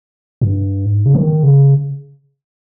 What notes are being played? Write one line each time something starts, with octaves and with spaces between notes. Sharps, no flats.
G2
G#2
C#3
D#3
C#3